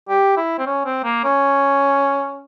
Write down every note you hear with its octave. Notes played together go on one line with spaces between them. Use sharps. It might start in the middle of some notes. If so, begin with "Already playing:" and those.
G4
E4
C4
C#4
C4
A#3
C#4